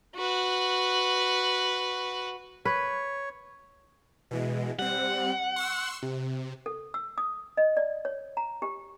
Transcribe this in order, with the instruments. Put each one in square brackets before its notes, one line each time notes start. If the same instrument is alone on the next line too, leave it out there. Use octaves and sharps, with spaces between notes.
[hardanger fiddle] F#4 B4
[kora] B4 [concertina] C#5
[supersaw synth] B2 E3 G#3
[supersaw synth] G3 C4 [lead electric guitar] F#5
[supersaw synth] C6 C#6 E6
C3
[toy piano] A4
E6
D#6
D#5
D5
C#5
A#5
G4